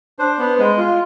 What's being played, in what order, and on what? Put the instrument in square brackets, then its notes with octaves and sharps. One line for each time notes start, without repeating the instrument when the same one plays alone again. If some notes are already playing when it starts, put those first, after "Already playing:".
[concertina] D4 C5
B3
G#3
F4